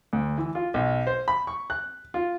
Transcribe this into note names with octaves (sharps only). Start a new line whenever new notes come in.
D2
E3
F4
B1
C5
B5
C#6
F#6
F4